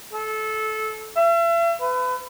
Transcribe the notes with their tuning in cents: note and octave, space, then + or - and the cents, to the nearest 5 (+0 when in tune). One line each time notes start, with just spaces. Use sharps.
A4 -20
E5 +40
B4 +30